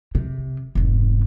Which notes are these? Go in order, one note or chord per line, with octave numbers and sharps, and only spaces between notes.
C3
F1 G#2